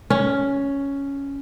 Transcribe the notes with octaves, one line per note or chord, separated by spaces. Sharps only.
C#4